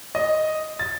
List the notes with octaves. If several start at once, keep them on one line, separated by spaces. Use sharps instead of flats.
D#5
A6